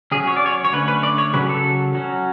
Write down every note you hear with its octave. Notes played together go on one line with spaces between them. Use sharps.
F#3 C#4 G#4
C#5
D5
C#5
C#5
D3 A3 C#4 B4
B4
D5
C#5
C#3 F#3 C#4 B4
A4
F#3 C#4